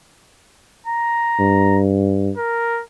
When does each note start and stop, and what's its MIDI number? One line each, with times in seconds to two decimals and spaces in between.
0.87 1.80 82
1.39 2.31 43
2.37 2.82 70